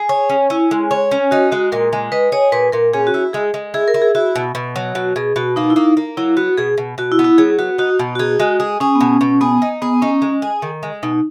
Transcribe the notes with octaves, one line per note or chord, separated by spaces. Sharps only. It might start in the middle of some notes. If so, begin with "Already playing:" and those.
Already playing: G#4
C#5
C#4
C#4 E4
G#3
C#5
C#4
D#4 F#4
G#3 F#4
A#2 A#4
G#3
D#4 B4
G#4 C#5
A#2 B4
A#2 A#4
C#4 G#4
F#4
E4
G#3 G#4
G#3
E4 G#4
A#4
E4
G#4
E4 F#4
B2
B2
F#3
B2 F#4
B2 G#4
B2 F#4
A#3 D#4
E4
A#3 D#4
A#3
F#3 E4
B3 F#4
B2 G#4
B2
B2 F#4
E4
B3
E4
F#3 G#4
B3 F#4
D#4 F#4
B2
F#4
D#4 G#4
G#3 F#4
G#4
C#4 G#4
B3
B2 C#4
B2 C#4
B3 G#4
D#4
B3 G#4
C#4 D#4
G#3
G#4
D#3
G#3
B2 D#4